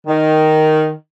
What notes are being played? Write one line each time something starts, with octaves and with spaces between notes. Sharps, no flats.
D#3